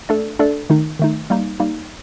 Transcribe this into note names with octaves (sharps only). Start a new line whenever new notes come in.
A3 D4 A4 D5
A3 D4 A4 D5
D#3 A3 D#4
D#3 A3 D#4
G3 A#3 D#4
G3 A#3 D#4